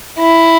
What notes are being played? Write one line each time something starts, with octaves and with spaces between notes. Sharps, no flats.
E4